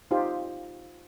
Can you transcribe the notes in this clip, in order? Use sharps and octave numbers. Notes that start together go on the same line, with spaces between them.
D#4 F4 G4 C5